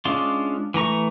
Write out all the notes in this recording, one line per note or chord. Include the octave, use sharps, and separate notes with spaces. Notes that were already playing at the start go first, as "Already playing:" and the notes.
G#3 C#4 D4 F4
E3 A3 A#5 C#6